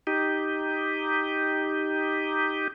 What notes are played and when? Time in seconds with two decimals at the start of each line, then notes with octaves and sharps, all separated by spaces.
0.07 D#4 G4